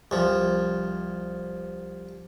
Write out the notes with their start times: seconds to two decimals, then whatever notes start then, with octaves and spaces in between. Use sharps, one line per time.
0.11 C2 F3